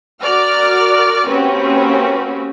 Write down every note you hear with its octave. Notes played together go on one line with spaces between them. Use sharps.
F#4 A#4 D5 F6
A#3 C4 C#4 F#4 G4 B4